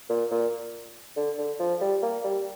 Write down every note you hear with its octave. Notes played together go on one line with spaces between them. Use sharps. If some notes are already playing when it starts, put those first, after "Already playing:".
A#2
A#2
D3
D3
F3
G3
A#3
G3